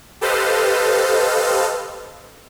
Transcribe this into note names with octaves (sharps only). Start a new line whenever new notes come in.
G4 A4 B4 C5 D#5 F5